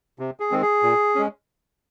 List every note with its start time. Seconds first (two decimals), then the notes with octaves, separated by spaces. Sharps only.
0.19 C3
0.40 G#4
0.51 D#3 G#3 C4
0.62 G#4
0.83 A#2
1.15 G#3 C#4